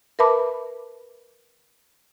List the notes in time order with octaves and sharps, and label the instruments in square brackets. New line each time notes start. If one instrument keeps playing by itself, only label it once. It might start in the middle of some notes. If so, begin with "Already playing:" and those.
[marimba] A#4 B4 E5 A5 B5 D6